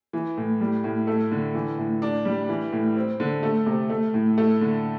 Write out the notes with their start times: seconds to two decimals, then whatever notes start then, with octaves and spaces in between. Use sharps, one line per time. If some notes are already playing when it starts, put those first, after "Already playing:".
0.13 E3
0.37 A2
0.61 G3
0.84 A2
1.07 A3
1.32 D3
1.54 E3
1.78 A2
2.02 D4
2.25 G3
2.49 E3
2.72 A2
2.97 C4
3.20 D3
3.43 A3
3.66 C3
3.90 A3
4.14 A2
4.38 A3
4.61 D3